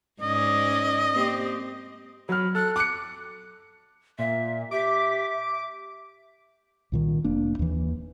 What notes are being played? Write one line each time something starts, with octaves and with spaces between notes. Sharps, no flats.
G#2 C#4 D5 D#5
A#3 C4 G4
F#3 B5 F6
A4 F#6
D6 F#6 C#7
A#2 E5
G4 E5 D6
C2 A#2 D#3
F1 A#3 D4
D#2 E3